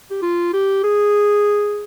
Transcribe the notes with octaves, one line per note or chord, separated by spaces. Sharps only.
G4
F4
G4
G#4